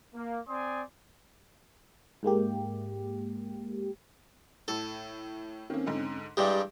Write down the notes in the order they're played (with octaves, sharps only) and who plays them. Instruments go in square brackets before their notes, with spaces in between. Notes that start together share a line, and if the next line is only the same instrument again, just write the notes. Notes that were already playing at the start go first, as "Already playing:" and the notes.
[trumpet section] A#3
C4 D5 G#5 C6 D#6
[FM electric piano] G#2 G#3 A#3 G4
[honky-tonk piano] A2 [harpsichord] A4
[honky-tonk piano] D#3 A#3 [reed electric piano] C4 C#4
[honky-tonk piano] G#2 D3 D#4
[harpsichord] G2 G3 G#3 [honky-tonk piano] E4 [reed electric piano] G4